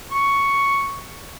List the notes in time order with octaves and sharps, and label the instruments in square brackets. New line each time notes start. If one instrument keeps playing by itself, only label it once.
[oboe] C#6